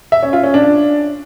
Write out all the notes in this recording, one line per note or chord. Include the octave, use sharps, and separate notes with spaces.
E5
C#4
F4
C#4
D4